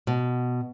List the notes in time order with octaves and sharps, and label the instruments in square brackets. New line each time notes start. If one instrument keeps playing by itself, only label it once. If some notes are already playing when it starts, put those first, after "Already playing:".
[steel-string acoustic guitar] B2